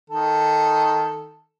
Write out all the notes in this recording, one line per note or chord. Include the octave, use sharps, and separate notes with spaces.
D#3 A4